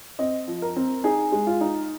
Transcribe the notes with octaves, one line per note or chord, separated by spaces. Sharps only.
C4 D#5
F3
A#4
C4
D#4 G#4
G#3
F4
D#4